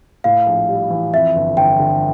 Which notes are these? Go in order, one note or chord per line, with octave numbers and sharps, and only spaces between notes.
A2 F5
A#1
G3
E3
F2 E5
G1
G1 G5
D3